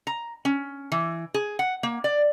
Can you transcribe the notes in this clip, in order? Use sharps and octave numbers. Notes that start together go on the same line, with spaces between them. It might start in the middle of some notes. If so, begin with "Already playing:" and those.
A#5
C#4
E3
G#4
F#5
A#3
D5